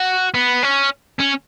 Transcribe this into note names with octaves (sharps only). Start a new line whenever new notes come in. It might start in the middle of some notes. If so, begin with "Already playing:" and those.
Already playing: F#4
B3
C#4
C#4